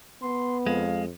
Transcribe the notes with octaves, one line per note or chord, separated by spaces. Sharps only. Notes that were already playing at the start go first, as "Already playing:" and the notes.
B3 C6
F2 G#3 F5